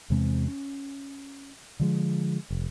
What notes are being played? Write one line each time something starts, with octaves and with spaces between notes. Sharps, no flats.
E2 C3 G#3 C4
C#4
D3 F3 G#3
F1